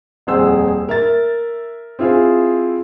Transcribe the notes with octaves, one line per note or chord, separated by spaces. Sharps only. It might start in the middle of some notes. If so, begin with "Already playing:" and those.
D#1 F2 G#4 C5 F#5 E6
A#4 E5 A6
C4 E4 F4 G#4